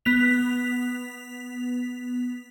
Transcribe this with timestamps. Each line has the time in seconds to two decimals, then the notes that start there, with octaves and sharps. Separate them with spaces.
0.05 B3 B6 F7